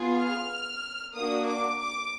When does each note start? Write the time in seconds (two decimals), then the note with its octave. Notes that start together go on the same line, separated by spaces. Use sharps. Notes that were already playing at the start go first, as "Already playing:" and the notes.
Already playing: B3 F4 G#4
0.18 F6
1.14 A#3 D4 F#4 D#6
1.47 D6
1.80 D6